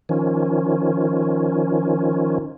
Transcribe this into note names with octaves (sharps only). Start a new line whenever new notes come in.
D#3 F3 C#4